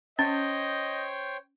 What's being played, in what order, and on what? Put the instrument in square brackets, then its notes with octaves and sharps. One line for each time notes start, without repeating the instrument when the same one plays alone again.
[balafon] C#4 [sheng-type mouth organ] C5 C#5 G5 [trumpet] D#5